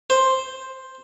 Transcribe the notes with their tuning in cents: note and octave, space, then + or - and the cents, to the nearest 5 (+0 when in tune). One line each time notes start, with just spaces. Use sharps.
C5 +5